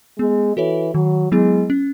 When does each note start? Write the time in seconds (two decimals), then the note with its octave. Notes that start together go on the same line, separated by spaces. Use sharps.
0.19 G#3 B3
0.56 E3 F#4 A4 C#5
0.94 D#3 F#3
1.32 F#3 G#3 B3 E4
1.70 C#4